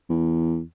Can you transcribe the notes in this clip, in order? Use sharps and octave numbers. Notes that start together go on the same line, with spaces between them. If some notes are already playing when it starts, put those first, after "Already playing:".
E2